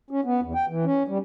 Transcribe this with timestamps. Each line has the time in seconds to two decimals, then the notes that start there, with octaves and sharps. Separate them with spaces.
0.11 C#4
0.24 B3
0.42 E2
0.55 G5
0.68 E3
0.85 C#4
1.08 G3